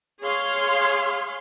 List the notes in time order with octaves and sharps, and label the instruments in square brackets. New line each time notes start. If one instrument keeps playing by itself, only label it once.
[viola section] G#4 C#5 F5 C6